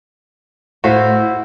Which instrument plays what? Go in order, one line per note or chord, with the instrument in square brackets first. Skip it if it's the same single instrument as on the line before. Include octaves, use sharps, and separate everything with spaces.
[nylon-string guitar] A2 A3 F5 [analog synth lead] E4 [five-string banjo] F#4 [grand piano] C5